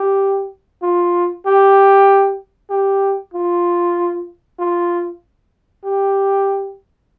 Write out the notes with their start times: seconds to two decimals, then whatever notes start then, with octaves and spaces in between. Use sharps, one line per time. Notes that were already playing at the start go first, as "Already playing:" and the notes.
Already playing: G4
0.82 F4
1.46 G4
2.70 G4
3.34 F4
4.59 F4
5.84 G4